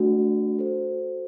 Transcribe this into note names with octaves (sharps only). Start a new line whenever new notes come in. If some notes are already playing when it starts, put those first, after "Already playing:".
Already playing: A3 D4 F#4
F#4 A4 C5